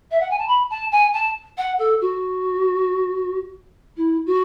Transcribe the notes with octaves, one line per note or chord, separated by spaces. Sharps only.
E5
F#5
G#5
A5
B5
A5
G#5
A5
F#5
A4
F#4
E4
F#4